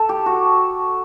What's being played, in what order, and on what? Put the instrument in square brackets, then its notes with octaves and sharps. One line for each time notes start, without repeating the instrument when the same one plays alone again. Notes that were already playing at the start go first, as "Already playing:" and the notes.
Already playing: [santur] A4
G4
F#4